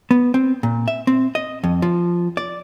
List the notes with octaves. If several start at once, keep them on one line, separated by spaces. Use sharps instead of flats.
B3
C4
A#2
E5
C4
D#5
F2
F3
D5